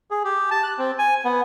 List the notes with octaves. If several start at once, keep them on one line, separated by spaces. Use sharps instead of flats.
G#4
G4
A5
F#6
C4
G#5
B3